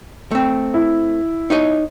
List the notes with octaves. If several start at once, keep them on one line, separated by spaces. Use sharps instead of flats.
A3 C4
E4
D#4 C#5 D#5